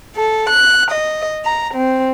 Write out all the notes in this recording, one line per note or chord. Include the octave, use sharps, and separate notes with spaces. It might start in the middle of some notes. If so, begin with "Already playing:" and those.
A4
F#6
D#5
A#5
C4